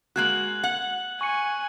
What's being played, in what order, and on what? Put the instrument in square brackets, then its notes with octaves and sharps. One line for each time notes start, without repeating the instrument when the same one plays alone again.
[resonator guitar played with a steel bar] G#3 A#3 F#4 [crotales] F#6 G#6 F#7
[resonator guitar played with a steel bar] F#5
[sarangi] G#5 [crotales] C#6 C#7